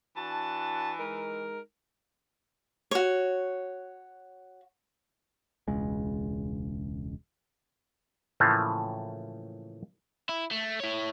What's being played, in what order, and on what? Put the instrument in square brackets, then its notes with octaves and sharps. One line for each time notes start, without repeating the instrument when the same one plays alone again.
[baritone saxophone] E3 [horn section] D4 F#4 A5
[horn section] G#3 D#4 A#4
[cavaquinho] F#4 C#5
[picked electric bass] E1 C#2 C#3 G#3
[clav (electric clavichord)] A2 C#3 E3 F3 A3 A#3
[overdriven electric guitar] E4
A3
E4 C#5